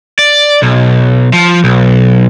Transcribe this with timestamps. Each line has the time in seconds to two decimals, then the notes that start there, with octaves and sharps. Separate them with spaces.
0.19 D5
0.62 B1
1.33 F3
1.64 B1